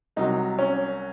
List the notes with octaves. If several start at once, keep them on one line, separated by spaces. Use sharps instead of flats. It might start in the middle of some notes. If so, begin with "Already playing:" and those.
C2 C3 F#3 D#4
C#4